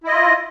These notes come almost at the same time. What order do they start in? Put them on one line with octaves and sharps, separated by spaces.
E4 D#5 F4